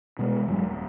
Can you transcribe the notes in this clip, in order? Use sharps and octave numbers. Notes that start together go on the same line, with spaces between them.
B2 G#3
G1 F2 F#3 G#3
D#1